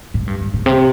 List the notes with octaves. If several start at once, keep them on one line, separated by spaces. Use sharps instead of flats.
A2
G2
G2
A2
C3